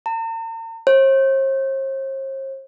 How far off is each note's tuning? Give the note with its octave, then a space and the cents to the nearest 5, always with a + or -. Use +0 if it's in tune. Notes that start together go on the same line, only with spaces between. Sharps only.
A#5 -45
C5 +45